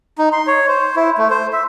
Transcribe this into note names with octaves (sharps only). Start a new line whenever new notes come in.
D#4
C6
C#5
C5
E4
A3
C5
E5